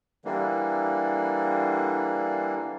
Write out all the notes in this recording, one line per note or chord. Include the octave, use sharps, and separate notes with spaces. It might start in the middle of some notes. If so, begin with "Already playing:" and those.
D3 E3 G3 A#3